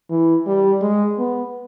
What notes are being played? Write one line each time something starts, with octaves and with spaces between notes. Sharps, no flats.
E3
G3
G#3
B3